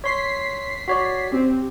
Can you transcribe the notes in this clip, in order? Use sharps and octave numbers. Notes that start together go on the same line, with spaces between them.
C#5 C6 B6 C7
F#4 C#5 D5
C4 G4